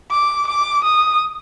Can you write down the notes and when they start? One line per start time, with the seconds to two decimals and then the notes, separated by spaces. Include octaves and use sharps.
0.11 D6
0.48 D6
0.84 D#6